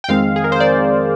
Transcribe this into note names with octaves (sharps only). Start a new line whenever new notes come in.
G5
F2 D#3 G#3 C4 F5
G#4
A#4
C5
D5